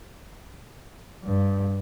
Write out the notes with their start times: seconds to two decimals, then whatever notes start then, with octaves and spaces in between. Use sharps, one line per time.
1.24 G2